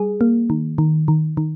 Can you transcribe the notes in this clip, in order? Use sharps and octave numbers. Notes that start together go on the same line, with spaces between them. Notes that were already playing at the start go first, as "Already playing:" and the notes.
Already playing: G3 G#4
A#3
D#3
D#3
D#3
D#3